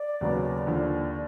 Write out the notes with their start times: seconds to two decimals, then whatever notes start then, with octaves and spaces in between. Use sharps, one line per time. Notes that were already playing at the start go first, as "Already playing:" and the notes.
Already playing: D5
0.21 D#2 C#3 F#3 B3
0.67 D#2 D3 F3